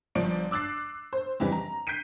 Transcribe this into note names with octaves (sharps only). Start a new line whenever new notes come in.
G1 F3 D5 D7
D6 E6 F#6 A6 C7
C5
F2 E3 G3
A#5
G6 B6 C7 D7 D#7